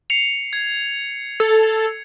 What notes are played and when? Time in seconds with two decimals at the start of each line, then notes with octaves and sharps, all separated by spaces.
0.10 C7 C#7 F7
0.53 G#6
1.40 A4